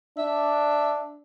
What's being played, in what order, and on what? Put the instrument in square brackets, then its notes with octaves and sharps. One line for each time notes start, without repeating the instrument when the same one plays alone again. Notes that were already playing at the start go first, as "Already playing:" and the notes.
[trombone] D4 [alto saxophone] E5